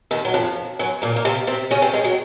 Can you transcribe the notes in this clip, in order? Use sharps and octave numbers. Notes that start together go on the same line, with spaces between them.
D#2 D#3
F#3
F2 F3
F#2 F#3
A#2 A#3
A#3
C3 C4
C3 C4
C#3 C#4
C3 C4
G#2 G#3
F#3